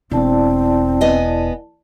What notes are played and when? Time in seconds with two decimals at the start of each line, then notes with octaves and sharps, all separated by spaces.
0.11 E1 C4 E4 D5 A5
1.01 B3 D#5 G#5